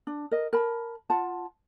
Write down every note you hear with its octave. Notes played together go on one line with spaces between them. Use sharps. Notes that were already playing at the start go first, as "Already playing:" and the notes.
D4
A#4 D#5
A#4 A5 B5
F4 F#5 A5